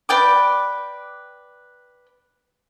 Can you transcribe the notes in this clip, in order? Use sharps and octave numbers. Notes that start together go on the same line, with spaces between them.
B4 D5 G5 D6